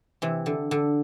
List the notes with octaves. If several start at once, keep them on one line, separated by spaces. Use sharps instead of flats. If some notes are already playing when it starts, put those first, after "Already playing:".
C3 E3
D3
D3